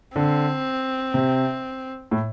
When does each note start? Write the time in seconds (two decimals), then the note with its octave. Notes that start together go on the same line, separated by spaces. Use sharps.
0.16 D3 C4
1.14 C3
2.11 A2